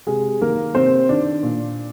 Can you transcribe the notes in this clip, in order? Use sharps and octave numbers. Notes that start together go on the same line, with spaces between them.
C3 G#3 G#4
D#3 A#3 A#4
C3 C4 C5
D#3 D4 D5
A#2